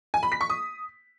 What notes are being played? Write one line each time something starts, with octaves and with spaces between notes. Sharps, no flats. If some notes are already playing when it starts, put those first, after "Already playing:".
G#5
B5
B6
C#6
D#6